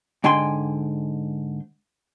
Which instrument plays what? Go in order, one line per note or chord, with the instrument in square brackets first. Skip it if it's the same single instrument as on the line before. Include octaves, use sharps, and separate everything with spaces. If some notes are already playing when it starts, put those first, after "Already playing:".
[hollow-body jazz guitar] G#2 D3 G5 G#5 C6